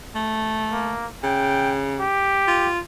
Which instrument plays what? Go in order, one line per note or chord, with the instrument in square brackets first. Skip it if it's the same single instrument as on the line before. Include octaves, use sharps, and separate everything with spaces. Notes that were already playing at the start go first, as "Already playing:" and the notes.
[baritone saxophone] A3
[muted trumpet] A#3
[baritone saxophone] C#3 [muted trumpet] G5
[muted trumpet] G4
[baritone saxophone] F4